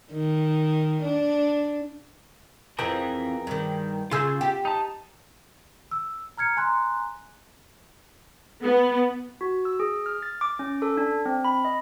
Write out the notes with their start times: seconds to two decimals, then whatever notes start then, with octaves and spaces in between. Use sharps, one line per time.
0.12 D#3
1.03 D4
2.79 F2 E3 G#4 A#4 G5
3.47 G2 D#3
4.11 C#3 F4 G#4 E6 G6
4.41 G4
4.65 D#4 A5
5.91 E6
6.38 A#5 F6 G#6 C#7
6.57 G#5 A#5 C6 F#6
8.63 B3
9.41 F#4
9.65 E6
9.80 G#4
10.06 F6
10.23 A6
10.41 D6
10.59 C#4
10.82 A4
10.97 D4
11.26 C4
11.45 B5
11.65 D#5